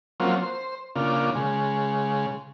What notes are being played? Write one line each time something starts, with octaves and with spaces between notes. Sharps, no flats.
F#3 A#3 C4 C#4 F4
C5
C#3 A#3 D4 F4
C#3 G#3